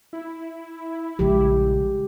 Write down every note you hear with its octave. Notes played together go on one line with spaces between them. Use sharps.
E4
A#1 C#3 F3 G#3 G4